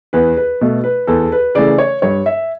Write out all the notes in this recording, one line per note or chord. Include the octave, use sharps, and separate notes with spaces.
E2 B4
B4
B2 A3
B4
E2 A4
B4
C#3 E3 A3 D5
C#5
G2 C#5
E5